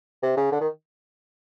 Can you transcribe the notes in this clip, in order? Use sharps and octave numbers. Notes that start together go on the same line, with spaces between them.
C3
C#3
D3
D#3